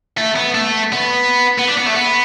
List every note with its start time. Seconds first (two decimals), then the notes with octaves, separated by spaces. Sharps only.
0.18 A3
0.36 B3
0.55 A3
0.93 B3
1.58 B3
1.67 D4
1.77 B3
1.86 A3
1.96 B3